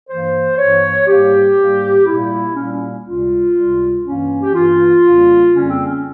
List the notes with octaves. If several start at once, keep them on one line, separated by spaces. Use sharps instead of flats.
G2 E3 A#3 C5
G2 E3 A#3 C#5
G#2 G3 A#3 G4
G#2 G3 A#3
A#2 G3 A#3 E4
A#2 G3 A#3 C#4
C#4
C#2 C3 G3 F4
C#2 C3 G3
G2 E3 A#3 C#4
G4
G2 E3 A#3 F4
F2 C#3 G3 A#3
F2 C#3 G3 A#3 C#4
C4
C#4